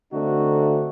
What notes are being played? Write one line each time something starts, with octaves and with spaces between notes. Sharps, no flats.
D3 A3 C4 D#4 F#4